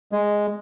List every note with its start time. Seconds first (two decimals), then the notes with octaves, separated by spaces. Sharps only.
0.12 G#3